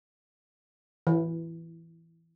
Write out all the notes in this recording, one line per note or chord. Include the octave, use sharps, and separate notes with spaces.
E3